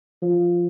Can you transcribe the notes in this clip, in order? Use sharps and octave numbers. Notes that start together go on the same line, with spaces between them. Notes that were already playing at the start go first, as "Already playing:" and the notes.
F3